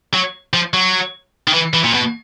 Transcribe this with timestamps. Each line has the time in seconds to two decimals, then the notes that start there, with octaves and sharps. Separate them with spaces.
0.14 F#3
0.54 F3
0.74 F#3
1.48 D#3
1.54 E3
1.73 E3
1.84 A#2
1.94 B2